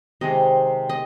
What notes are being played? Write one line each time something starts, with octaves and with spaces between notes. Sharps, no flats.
C3 D#3 G#3 D#5
D#5